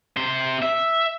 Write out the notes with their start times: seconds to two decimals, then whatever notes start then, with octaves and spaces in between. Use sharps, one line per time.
0.17 C3 C5
0.63 E5